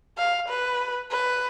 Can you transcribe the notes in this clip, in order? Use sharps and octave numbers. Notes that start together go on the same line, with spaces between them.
F5
B4
B4